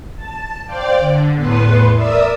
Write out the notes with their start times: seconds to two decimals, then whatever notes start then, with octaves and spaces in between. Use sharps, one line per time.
0.16 A5
0.66 C5 D5 F5 G5 D6
0.99 D3
1.34 E2 A2 B3 B4 C6
1.95 A#4 D5 E5 D#6 E6